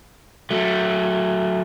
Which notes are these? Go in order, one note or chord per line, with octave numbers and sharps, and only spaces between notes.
F#3 A3